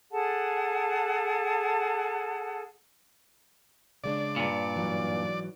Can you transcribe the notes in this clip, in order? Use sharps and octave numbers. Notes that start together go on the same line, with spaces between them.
G#4 A4 F#5 A5
C#3 G#3 D4 D5
G2 A#2
G#2 E3 F#3